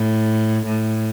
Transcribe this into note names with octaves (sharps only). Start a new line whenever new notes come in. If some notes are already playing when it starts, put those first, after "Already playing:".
Already playing: A2
A2